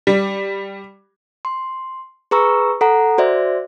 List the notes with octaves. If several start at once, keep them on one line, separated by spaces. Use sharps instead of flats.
G3
C6
G#4 B4 A#5 C#6 E6
A4 F#5 A#5
F#4 C5 D5 E5